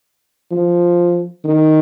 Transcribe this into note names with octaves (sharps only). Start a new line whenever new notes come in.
F3
D#3